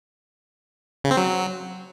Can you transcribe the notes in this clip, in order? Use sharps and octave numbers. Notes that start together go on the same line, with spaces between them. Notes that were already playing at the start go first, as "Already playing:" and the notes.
C#3
C4
F#3